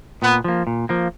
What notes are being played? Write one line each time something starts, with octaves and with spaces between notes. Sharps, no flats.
A#2 B3
F3 A#3
A#2
F3 A#3